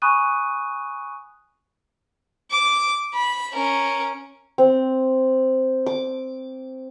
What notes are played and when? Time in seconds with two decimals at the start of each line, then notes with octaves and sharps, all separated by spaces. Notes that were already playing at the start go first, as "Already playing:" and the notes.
0.02 G#5 B5 C#6 D#6 F#6 D#7
2.51 D6
3.14 B5
3.53 C#4 A#4
4.58 C4
5.86 D6